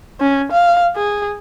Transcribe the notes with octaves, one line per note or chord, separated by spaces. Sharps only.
C#4
F5
G#4